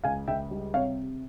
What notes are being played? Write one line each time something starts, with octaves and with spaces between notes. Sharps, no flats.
C#2 F5 G#5
C#2 E5 G5
G3
C3 C#5 F5